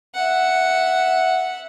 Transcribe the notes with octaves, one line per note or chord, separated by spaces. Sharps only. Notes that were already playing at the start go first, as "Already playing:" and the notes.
E5 F#5